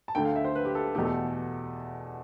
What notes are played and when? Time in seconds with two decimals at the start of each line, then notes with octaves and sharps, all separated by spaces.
0.08 A5
0.15 D2 D3 A3 G5
0.25 F5
0.36 E5
0.44 C5
0.55 B4
0.65 G4
0.75 A4
0.95 E2 B2 A3 G4
1.05 A4